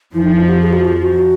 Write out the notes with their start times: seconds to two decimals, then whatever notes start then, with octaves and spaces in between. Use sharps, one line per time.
0.14 F2 F3 E4
0.22 D#4
0.32 E4
0.40 F4
0.49 G4
0.61 G#4
0.73 F#4
0.85 F4
1.02 F#4